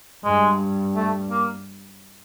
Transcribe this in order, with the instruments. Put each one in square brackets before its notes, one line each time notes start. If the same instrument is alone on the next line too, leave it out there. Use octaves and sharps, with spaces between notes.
[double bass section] G2 [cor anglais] G#3
[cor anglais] A3
A#3